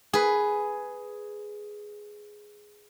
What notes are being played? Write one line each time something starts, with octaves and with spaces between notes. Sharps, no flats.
G#4 B4